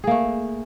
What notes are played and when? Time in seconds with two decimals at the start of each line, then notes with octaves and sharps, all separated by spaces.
0.04 G#4
0.07 A#3
0.11 A3